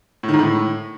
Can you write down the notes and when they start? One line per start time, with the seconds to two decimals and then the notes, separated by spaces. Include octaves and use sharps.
0.23 A2
0.28 D#3
0.34 G#2
0.39 A2